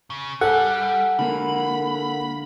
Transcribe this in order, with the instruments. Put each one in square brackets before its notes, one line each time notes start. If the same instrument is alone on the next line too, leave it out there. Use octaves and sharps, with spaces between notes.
[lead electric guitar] C#3
[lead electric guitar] G3 [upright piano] A4 G#5 [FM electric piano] F#5
[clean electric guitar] D3 A#3 [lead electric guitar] B5